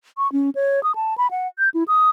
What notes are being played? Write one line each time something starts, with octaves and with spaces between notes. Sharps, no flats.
C#6
C#4
C#5
D#6
A5
B5
F#5
G6
E4
D#6